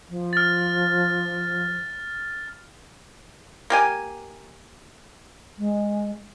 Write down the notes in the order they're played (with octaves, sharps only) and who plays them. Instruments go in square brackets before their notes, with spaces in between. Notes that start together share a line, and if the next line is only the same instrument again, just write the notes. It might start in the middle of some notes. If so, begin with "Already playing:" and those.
[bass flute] F3
[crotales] F6 A6
[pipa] A#3 G4 G#5
[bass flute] G#3